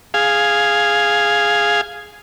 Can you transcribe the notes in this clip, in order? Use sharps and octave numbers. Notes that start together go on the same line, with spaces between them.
G#4 F5